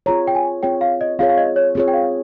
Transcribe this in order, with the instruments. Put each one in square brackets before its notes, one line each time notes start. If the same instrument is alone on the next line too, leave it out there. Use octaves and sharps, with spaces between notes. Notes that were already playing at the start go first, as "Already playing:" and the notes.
[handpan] C4 F4 G#4 C#5 [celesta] A#5
[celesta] G5
G#5
[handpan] C4 F4 G#4 C#5 [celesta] G5
[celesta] F5
D#5
[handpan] C4 F4 G#4 C#5 [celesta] F5
[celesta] F5
D#5
C#5
[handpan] C4 F4 G#4 C#5
[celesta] G5
F5